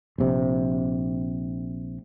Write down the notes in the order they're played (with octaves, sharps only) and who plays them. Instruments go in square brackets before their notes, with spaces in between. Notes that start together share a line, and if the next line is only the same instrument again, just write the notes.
[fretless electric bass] A#1 C3